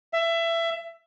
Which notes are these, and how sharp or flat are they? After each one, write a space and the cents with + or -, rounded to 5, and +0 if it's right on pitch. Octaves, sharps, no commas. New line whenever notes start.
E5 +20